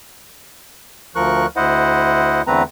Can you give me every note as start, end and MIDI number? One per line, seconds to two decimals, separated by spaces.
1.16 1.46 38
1.16 1.46 53
1.16 1.46 70
1.16 1.46 85
1.16 1.46 90
1.56 2.42 38
1.56 2.42 64
1.56 2.42 72
1.56 2.42 75
1.56 2.42 78
2.47 2.63 40
2.47 2.63 50
2.47 2.63 57
2.47 2.63 60
2.47 2.63 71
2.47 2.63 82